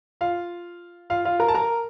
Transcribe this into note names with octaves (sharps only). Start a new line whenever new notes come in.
F4 F5
F4 F5
F4 F5
A#4 A#5
A5
A#4 A#5